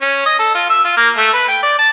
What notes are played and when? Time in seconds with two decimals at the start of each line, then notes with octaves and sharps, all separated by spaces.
0.02 C#4
0.26 D#5
0.39 A4
0.55 F4
0.70 E5
0.84 F4
0.97 A#3
1.17 A3
1.34 B4
1.48 G5
1.63 D5
1.79 A5